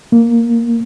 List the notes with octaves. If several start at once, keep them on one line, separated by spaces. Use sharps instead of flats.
A#3